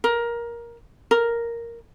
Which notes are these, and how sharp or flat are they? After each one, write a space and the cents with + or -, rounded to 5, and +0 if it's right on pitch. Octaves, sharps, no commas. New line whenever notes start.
A#4 +15
A#4 +0